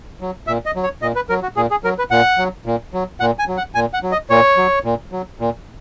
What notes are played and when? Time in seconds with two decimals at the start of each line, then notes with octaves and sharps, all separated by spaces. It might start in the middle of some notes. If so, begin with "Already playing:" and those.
0.21 F#3
0.47 A#2 E5
0.66 D#5
0.76 F#3
0.83 C#5
1.02 A#2 D#5
1.16 B4
1.29 F#3 A#4
1.43 F#4
1.56 A#2 G#4
1.71 G#4
1.84 F#3 A#4
1.98 B4
2.11 A#2 F#5
2.38 F#3
2.66 A#2
2.93 F#3
3.20 A#2 F#5
3.39 G#5
3.47 F#3
3.57 F#5
3.75 A#2 G#5
3.94 F#5
4.03 F#3
4.12 D#5
4.30 A#2 C#5
4.57 F#3
4.84 A#2
5.12 F#3
5.40 A#2